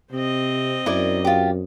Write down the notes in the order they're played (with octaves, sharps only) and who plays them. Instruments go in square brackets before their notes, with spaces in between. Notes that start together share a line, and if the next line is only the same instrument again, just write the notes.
[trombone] C3 [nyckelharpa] C4 D#5
[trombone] F#2 [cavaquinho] E4 A#4 D5
[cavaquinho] F4 G4